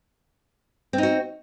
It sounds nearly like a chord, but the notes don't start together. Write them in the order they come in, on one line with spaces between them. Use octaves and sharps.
C4 D#4 F#4